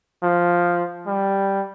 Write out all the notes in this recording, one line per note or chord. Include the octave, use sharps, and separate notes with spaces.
F3
G3